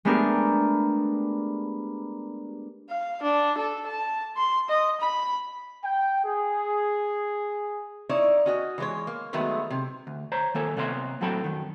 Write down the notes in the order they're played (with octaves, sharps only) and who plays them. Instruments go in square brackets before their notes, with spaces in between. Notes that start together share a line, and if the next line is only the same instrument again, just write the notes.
[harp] G#3 A3 B3 D4 G4 A#4
[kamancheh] F5
D4
A4
A5
C6
D#5
B5
[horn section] G5
G#4
[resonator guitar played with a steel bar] D#4 E4 C#5 D5
C#4 F#4 D#5
E3 G#3 C#5
A#3
D#3 F#3 G#3 A3 B3
C3
[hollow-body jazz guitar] D2
C5 C#5 A#5
D#3 A#3 A4 C#5
C3 A#3 B3 C#5 F#5 C6
A2 F#3 C4 A4 G5 B5
F#2 D#3